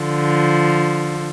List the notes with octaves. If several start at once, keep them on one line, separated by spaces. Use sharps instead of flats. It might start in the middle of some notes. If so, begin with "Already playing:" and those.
Already playing: D3 F3